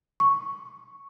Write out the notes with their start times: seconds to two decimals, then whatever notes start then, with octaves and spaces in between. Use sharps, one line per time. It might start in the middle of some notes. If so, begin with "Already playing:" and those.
0.20 C#6